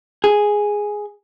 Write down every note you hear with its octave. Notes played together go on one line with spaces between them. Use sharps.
G#4